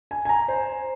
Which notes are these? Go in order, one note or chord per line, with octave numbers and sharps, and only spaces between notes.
G#5
G#5
A#5
C5